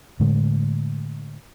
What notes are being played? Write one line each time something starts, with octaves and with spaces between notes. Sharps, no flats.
A2 D3 G#3